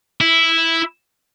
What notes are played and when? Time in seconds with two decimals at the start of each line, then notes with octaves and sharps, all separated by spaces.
0.21 E4